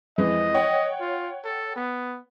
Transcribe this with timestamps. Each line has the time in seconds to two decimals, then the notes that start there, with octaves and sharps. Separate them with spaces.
0.18 F2 E3 G#3 D#5
0.54 C#5 F#5 G5
1.01 F4
1.44 A4
1.76 B3